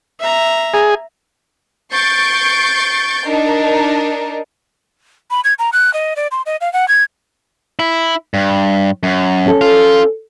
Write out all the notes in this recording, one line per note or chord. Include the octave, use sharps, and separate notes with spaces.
E5 A#5
G#4
C#6 G6 A6 C7 D7
D4 D#4 A#4
B5
G#6
A#5
F#6
D#5
D5
C6
D#5
F5
F#5
G#6
E4
G2
F#2
C#4 A4
F4